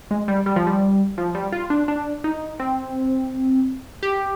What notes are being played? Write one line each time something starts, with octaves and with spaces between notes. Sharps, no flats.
G#3
G3
G3
F3
G3
F3
G3
F4
D4
D4
D#4
C4
G4